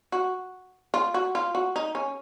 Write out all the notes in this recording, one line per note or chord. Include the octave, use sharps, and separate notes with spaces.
F#4
F4
F#4
F4
F#4
D#4
C#4